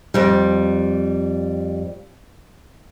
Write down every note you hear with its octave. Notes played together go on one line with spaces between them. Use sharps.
F2 G3